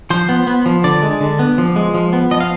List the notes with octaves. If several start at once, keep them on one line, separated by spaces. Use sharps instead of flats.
F3 C5
B3
B3
F3
D3 D5
G#3
D3
B3
F3
G#3
F3
B3
F3 D#5
F5